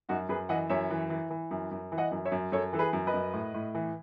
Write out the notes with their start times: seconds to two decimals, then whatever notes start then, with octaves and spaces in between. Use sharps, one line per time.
0.09 F#2 D#4 F#4
0.29 F#2 G#4 B4
0.49 E3 D#5 F#5
0.70 F#2 C#5 E5
0.90 E3
1.10 E3
1.30 E3
1.51 F#2
1.71 F#2
1.92 E3
1.98 D#5 F#5
2.12 F#2
2.25 C#5 E5
2.32 F#2
2.52 F#2 A4 C#5
2.73 E3 A4
2.79 G#4 B4
2.93 F#2
3.07 B4 D#5
3.14 F#2
3.33 A2
3.54 A2
3.75 E3